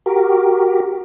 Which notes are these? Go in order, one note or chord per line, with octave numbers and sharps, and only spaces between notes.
F#4 G4 A#4